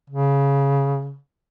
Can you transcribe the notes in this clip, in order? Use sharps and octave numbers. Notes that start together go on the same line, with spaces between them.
C#3